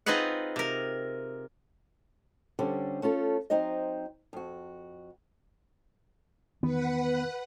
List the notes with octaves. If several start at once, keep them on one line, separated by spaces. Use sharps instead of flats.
C4 D#4 F4 G#4 B4 F#5
C3 A#4
D3 G3 C#4 G4 C5
A3 C#4 F4 A4
F#3 C4 D#4 C5 D#5
F2 F#4
E2 D#3 B3 B4 F#5